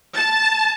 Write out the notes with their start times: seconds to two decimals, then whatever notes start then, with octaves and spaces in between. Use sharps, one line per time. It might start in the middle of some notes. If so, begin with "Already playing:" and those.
0.15 A5